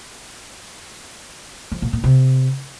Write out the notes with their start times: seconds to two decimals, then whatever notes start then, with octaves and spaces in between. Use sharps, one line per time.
1.72 F3
1.82 A#2
1.93 A#2
2.04 C3